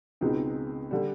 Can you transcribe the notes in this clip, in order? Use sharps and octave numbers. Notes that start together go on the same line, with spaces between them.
C#2 B2 G#3 C4 D#4
D3 G3